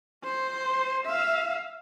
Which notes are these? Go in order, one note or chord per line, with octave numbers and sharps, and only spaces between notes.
C5
E5 F5